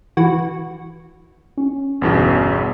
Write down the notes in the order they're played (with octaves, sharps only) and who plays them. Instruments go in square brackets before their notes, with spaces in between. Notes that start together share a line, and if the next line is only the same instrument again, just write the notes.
[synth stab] E3 F#4
[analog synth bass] C#4
[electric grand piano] G1 E2 B2